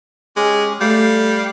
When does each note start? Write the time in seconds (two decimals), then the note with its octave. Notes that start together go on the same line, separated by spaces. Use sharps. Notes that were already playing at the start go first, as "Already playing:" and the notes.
0.36 G#3 C#4 G4
0.81 G3 A3 F5